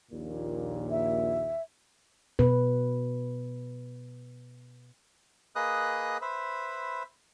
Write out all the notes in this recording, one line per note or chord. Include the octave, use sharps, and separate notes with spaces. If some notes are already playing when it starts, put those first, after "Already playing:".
A#1 D#2 A#2
E5
B2 B3 B4
A#3 G#4 B4 D#5 D#6 F#6
B4 C5 E5 B5